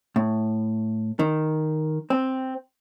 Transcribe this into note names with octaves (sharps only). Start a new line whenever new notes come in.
A2
D#3
C4